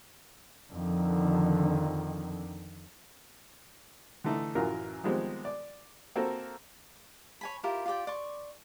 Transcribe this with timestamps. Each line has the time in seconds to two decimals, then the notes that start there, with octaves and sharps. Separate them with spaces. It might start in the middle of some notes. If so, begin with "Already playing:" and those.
0.73 F2 D3 D#3
4.24 D3 E3 A3 D#4
4.55 A1 F#2 E3 F#3 F4 A#4
5.04 D#3 F3 G3 G#3 B3 C4
5.45 D5
6.16 A#3 C4 F#4 A4 A#4
7.41 C#5 G#5 B5
7.63 E4 F4 G4 A#4
7.86 F4 G4 D5 G5
8.07 D5 C6 C#6